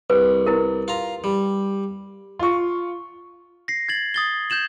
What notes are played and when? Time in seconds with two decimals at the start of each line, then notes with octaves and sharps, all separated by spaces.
0.10 C2 B4
0.46 E4 A#4
0.88 F4 A#5
1.24 G3
2.39 F4 C#6
3.68 A#6 C7
3.89 G#6 A6 F#7
4.14 D#6 A6 G7
4.50 G6 G#6 E7 F#7